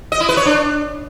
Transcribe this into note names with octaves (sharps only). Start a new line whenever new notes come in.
D#5
E4
B4
C#5
D4